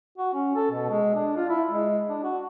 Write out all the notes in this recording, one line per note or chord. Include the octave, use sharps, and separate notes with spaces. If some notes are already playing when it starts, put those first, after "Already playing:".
F#4
C#4
A4
B2
G#3
D4
F4
E4
G#3
D4
F#4